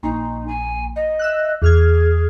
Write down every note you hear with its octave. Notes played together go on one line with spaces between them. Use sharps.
A#1 D#4
G#5
D#5
E5 E6 F#6
E2 G#4 F6 G#6